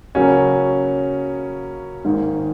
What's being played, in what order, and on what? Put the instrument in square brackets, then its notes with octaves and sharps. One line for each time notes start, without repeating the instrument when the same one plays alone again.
[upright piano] C#3 F#3 A#3 F#4 [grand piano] C#4
[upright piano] G#1 G#2 D#3 A#3